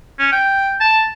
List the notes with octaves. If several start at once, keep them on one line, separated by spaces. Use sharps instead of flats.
C#4
G5
A5